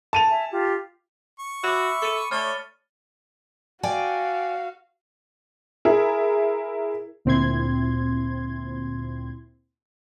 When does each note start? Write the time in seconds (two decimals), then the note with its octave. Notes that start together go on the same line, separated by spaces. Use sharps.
0.13 A5 D#7 F7
0.29 E5 G#5
0.51 F4 G4
1.39 C#6
1.64 F#4 E5 B5 D6
2.02 A4 C#7 D#7
2.31 A3 C#5 D5 F6 A6 G7
3.83 F#4 D5 F5 G5 G#5
5.85 E4 G#4 A#4
7.25 D2 A#2 C4 E4 C6 G#6